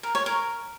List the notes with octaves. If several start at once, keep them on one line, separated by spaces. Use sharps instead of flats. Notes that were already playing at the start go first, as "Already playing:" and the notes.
A#4
C#5
A#4